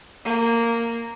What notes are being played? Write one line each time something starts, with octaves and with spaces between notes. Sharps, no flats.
A#3